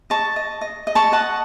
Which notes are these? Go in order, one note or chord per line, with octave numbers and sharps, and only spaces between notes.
D#5 A5 C#6
D#5
D#5
D#5
A5 C#6
D#5 F#5 A5